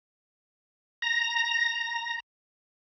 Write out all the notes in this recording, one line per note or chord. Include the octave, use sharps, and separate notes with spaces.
A#5 A#6